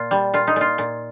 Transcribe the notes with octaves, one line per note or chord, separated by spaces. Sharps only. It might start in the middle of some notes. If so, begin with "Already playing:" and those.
Already playing: A#2 F4
G3
A#2 F4
D#4
A#2 F4
A#2